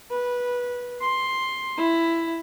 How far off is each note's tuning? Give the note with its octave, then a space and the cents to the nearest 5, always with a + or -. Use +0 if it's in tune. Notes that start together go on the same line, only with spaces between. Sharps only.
B4 -15
C6 +10
E4 +10